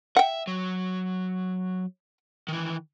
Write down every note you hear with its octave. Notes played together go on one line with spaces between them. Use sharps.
E5 F#5 G5
F#3
D#3 E3